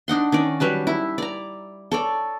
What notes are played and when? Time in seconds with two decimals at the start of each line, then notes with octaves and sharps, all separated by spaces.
0.08 D4 D#4 F#5 C6
0.32 D#3 C#4 D5
0.60 F#3 G3 B4 A5
0.87 E4
1.18 D5 A#5
1.92 A4 C#5 D5